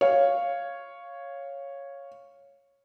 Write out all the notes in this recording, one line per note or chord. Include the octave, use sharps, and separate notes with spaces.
C#5 F5